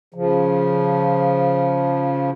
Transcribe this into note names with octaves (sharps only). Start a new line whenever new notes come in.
C#3 F3